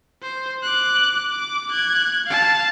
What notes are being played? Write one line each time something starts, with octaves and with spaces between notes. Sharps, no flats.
C5
D6 F#6
D6
F#6 G#6
F5 A5